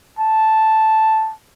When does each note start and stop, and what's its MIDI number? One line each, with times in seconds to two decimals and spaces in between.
0.19 1.33 81